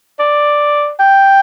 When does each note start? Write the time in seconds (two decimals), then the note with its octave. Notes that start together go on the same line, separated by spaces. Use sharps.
0.19 D5
1.00 G5